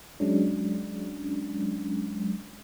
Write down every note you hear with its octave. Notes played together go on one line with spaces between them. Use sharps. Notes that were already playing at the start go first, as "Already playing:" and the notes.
F#3 G#3 C#4 D4